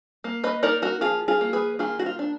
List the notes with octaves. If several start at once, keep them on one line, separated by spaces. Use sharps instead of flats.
A#3
B4 D#5
D#4 A#4 D5
F#4 A#4
F3 F4 G#4
F4 G#4
A#3
G#4 B4
D#3 F4 G#4
F#4
F4
D4